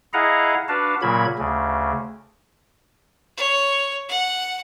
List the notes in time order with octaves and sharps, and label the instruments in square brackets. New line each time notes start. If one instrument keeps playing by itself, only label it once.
[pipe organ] E4 G#4 D#5 F5 F#5 A#5
D4 F#4 B4 F5 A5
A#2 C#3 F#3 A#3 B5 G#6
D2 C#3
[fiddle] C#5
F#5